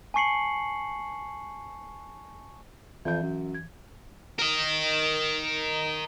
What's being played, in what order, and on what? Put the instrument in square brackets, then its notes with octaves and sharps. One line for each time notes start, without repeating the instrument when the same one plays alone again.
[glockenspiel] G#5 A5 C#6 C7 C#7 F#7
[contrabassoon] F2 [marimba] E3 G6
[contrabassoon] F#2
[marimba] G#6
[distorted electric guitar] A#4 D#5